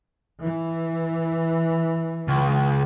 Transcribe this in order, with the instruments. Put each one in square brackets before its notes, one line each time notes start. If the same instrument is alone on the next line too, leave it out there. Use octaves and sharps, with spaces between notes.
[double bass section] E3
[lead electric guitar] C#2